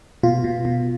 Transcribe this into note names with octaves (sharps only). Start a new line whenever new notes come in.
B2 F4
B2
B2